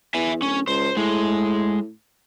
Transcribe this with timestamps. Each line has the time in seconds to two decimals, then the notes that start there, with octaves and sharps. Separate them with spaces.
0.14 E2 E5 G#5
0.42 D1 C#4
0.68 C#2 C5
0.97 A2 G#3